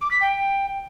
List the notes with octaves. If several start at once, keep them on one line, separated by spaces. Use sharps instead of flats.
D6
B6
G5